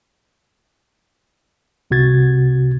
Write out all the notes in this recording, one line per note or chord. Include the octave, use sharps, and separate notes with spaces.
C2 C3 F#4 G#6 A6